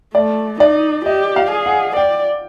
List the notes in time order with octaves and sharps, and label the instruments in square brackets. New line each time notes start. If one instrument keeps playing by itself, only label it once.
[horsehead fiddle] A3 [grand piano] D5
[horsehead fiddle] D#4 [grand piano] D5
[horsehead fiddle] G4 [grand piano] D#5
[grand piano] F5
[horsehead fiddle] G#4
[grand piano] F#5
[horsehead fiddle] D5 [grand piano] G5